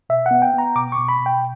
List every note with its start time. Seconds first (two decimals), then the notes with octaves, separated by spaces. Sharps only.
0.09 B2 E5
0.26 B3 F#5
0.42 G5
0.54 B3 A#5
0.76 B2 D6
0.92 C#6
0.98 B2
1.09 B5
1.20 B2
1.26 G5